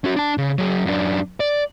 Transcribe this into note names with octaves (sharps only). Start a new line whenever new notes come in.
C#4 F#4
D4 A5
C#3
F#3 G#4
F#2 D4
D5